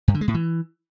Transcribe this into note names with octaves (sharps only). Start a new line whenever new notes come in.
G2
D3
G#3
A2
E3